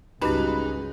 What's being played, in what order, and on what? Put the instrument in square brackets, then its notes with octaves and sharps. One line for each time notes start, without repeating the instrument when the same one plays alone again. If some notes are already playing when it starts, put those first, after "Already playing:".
[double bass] C#2 [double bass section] G2 G#3 [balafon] C#4 F#4 G4 [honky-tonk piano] D#4 B4